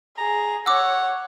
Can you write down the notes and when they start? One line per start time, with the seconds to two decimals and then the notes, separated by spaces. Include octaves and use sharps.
0.18 G#4 A#5
0.66 C#5 F#5 D6 E6